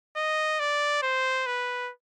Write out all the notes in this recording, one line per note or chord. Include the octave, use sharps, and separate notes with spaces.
D#5
D5
C5
B4